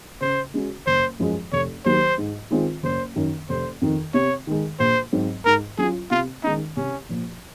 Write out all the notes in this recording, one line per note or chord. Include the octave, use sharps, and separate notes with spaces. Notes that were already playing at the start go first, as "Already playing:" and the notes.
C#3 C5
G#3 C#4 F#4
F#1 C5
F#2 F3 G#3
F1 C#5
D#2 D#3 F#3 C5
G#2
D#3 G#3 C4 F4
F#1 C5
F#2 D#3
F1 C5
F2 D#3
C3 C#5
D#3 G#3
A#1 C5
G#2 F#3 C4
G#2 A#4
F#3 C#4 F4 G#4
C3 F4
D#3 G#3 C#4 D#4
C2 C#4
A#2 F3